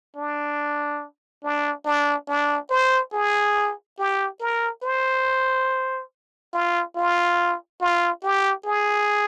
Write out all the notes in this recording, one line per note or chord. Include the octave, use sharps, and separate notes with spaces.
D4
D4
D4
D4
C5
G#4
G4
A#4
C5
F4
F4
F4
G4
G#4